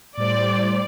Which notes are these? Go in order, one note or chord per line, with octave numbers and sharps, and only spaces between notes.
A2 G3 C5 D5